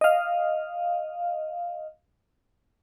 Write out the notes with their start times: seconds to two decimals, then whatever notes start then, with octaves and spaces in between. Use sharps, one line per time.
0.01 D#5 F5